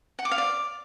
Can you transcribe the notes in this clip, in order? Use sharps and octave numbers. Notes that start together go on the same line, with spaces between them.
F#5
D6
F5
D5